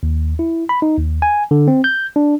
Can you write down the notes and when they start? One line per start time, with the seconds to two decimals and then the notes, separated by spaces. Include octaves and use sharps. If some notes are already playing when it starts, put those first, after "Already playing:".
0.03 D#2
0.39 E4
0.69 B5
0.82 D#4
0.98 D#2
1.22 G#5
1.51 D3
1.68 C4
1.84 G6
2.16 D4